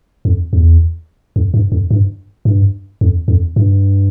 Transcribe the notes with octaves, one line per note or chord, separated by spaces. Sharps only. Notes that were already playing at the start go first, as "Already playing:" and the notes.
F2
E2
F2
G2
F2
G2
G2
F2
F2
G2